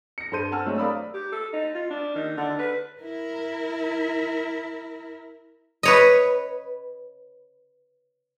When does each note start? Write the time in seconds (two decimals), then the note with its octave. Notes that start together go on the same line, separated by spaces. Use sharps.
0.18 A#6 C#7
0.32 G2 A4 C5 C6 G6 D#7
0.52 F#5 G#5 A5 E6 F6
0.66 F#3 G#3 A3 C4 D4
0.78 A#4 D5 F5 B5 D#6 E6
1.14 G4
1.32 A4
1.53 D#4
1.75 F4
1.90 D4
2.15 D#3
2.37 D3
2.59 B4
3.01 E4 A#4
5.83 B4 C#5 D#5